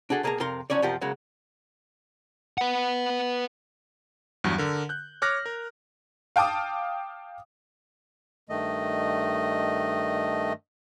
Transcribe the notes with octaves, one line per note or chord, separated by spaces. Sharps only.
D4 F#4 G#4 A4
B1 A#3 G#4 A#4 A5 A#5
F2 C3 A#4 F5 C6
F3 F#3 C#4 C#5 D5
F#2 C3 F3 F4 G4 A#4
C#3 F#3 G#3 A#3
B4 F#5
E2 G2 F#3
D3 A#4
F#6 G6
C#5 D6 F6 F#6 A#6
A#4
F5 G5 A5 D6 D#6
G2 D#3 A3 D#5